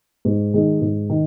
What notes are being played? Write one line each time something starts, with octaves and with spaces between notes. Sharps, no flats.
G#2
D#3 G#3 D#4
G#2
D#3